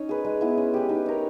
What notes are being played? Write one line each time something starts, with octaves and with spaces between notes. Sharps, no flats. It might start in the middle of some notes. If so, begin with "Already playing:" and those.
Already playing: C#4 D#4 C#5
G#4 B4
G#3
B3 E4
C#4
G4 B4
D#4
A#4 C#5